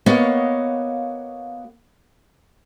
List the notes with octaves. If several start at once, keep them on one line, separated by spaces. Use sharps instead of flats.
A#3 B3 F#4 C#5 D#5 F5